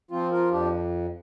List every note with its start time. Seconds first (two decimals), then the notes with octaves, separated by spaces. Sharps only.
0.11 F3 C4 F4
0.31 F4 A#4
0.51 F2 D4 G4